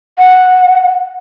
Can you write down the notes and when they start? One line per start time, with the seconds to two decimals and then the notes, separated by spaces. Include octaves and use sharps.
0.18 F#5